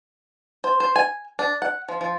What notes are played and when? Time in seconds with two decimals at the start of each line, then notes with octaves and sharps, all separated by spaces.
0.64 C5
0.80 C5
0.96 G#5
1.39 D4
1.62 F#5
1.89 F3
2.01 F3